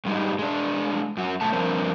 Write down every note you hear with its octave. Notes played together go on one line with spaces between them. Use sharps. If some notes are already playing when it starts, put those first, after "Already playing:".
G2 G3 G#3 D#4
G#3 D4
F#2 F#4
F#2 B2 A3 A5
G2 F3 C4 D4 A#4 C5